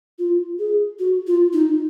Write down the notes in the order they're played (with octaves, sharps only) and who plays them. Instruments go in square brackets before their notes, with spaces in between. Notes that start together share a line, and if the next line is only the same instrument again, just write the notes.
[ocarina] F4
G#4
F#4
F4
D#4